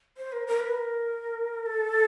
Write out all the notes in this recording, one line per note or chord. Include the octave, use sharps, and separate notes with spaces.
C5
A#4
A#4
B4
A#4
A4